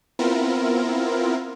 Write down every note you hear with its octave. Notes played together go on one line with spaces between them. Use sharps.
B3 C4 E4 F4 A#4